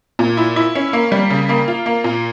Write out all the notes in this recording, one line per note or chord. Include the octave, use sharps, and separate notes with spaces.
A#2
E4
E4
C#4
A#3
G3
C#3
A#3
F4
A#3
A#2